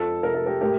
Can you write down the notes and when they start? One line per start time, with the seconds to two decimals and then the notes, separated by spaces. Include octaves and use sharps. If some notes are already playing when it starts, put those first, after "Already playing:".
Already playing: F2 F4 A4
0.23 C3 A#4
0.35 A4
0.46 G4 A#4
0.61 A2 G4 A#4